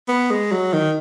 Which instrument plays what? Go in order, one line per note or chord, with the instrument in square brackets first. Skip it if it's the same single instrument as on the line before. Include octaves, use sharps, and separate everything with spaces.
[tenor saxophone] B3
G#3
F#3
D#3